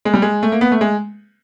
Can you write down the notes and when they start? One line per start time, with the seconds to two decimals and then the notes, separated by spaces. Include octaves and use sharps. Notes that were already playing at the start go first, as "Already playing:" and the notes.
0.05 G#3
0.14 G3
0.22 G#3
0.43 A3
0.52 A#3
0.61 B3
0.72 A3
0.81 G#3